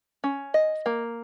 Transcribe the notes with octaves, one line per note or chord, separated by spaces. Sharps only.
C#4
D#5
A#3